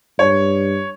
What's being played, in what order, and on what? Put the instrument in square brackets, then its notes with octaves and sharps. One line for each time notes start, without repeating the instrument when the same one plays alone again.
[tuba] G2 [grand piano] C#5